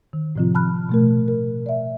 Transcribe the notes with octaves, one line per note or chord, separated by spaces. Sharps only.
D#3
A2 C3 F3 C4 F4
A5 B5 F6 F#6
B2 A3 A#4
A#4
D5 E5